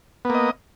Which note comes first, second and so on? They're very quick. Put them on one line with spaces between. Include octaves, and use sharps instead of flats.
B3 A#3 D#5